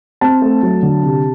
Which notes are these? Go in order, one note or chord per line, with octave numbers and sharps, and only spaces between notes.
C4 A5
A3
F#3
D3
C3